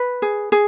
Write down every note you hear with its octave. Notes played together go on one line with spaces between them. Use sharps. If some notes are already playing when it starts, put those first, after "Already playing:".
Already playing: B4
G#4
G#4